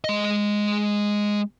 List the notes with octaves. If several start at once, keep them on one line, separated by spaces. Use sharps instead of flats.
G#3 D#5